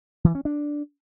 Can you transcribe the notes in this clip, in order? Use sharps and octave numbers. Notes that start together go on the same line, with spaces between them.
E3
C#4
D4